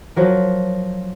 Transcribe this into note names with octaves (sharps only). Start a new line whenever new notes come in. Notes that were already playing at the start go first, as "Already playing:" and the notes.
F3 F#3 A#4